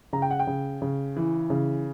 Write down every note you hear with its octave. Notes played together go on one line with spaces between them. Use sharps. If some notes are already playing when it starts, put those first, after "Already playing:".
C#3 A#5
G5
F#5
G5
C#3
C#3
E3
C#3